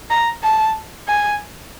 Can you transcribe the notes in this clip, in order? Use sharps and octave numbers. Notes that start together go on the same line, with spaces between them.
A#5
A5
G#5